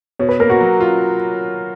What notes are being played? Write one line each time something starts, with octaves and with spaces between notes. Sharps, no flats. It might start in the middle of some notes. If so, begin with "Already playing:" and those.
B2 C#5
B4
A#3 A#4
F#4
F#3
F4